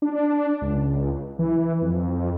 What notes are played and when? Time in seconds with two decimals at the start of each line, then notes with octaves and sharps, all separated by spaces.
0.02 D4
0.62 C#2
1.39 E3
1.82 F2